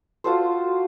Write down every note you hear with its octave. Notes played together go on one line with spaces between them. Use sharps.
F4 F#4 A4 C5